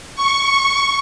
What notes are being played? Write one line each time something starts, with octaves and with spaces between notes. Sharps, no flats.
C#6